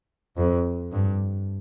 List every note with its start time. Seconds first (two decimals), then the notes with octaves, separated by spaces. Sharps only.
0.37 F2
0.92 G2